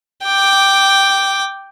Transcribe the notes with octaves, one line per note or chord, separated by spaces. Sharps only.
G5 D6